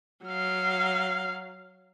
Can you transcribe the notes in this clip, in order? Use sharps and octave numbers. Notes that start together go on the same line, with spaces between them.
F#3 F5